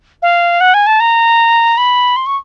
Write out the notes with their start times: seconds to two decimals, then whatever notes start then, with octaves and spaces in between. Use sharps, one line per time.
0.22 F5
0.60 F#5
0.74 G#5
0.87 A5
1.00 A#5
1.77 B5
2.16 C6
2.26 C#6